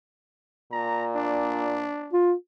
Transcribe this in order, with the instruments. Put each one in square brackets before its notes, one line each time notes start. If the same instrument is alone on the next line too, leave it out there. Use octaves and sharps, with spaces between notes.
[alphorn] A#2 [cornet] A#5
[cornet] D4
[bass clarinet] F4